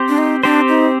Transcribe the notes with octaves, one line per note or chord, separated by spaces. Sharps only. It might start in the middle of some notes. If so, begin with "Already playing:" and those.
Already playing: C4 G4 C5
D4
D#4
C4 D4 G4 C5
D#4